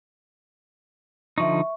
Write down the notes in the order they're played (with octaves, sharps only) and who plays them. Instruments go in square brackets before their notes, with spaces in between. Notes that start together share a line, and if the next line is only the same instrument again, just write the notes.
[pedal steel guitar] D3 F3 D#4 [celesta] E5 C#6